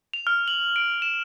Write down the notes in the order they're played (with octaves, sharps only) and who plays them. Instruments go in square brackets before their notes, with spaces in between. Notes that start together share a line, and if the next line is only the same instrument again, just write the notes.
[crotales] F7
F6
F#7
D7
E7